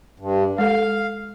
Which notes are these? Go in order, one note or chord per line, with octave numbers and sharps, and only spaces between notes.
G2
G#3 A4 F5